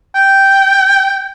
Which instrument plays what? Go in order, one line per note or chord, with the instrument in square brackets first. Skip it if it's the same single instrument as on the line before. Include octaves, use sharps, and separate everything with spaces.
[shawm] G5